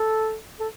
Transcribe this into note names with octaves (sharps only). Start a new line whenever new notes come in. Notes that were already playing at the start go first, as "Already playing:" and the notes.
Already playing: A4
A4